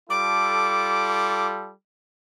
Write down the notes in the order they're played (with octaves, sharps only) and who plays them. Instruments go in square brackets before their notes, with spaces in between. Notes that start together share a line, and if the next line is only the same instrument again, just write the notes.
[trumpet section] G3 F4 A4 [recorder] D6